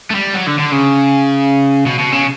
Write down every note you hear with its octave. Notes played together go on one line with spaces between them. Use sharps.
A3
G3
F#3
D3
D3
C#3
B2
B2
C#3